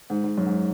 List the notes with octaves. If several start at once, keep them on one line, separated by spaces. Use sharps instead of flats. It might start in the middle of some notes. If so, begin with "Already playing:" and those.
G#2
G#2
F#2
G#2